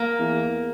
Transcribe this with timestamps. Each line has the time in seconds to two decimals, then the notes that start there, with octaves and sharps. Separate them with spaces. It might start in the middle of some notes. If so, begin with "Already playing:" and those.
Already playing: A#3
0.19 E2